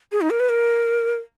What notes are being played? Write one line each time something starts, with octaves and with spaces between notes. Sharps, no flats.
G#4
D#4
A#4
B4
A#4